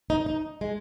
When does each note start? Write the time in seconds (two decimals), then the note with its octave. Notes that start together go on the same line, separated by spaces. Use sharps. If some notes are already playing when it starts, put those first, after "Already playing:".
0.10 D#4
0.26 D#4
0.61 G#3